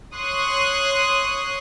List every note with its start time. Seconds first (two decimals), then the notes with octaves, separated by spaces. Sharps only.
0.16 C#5 C6 C#6 D#6 F#6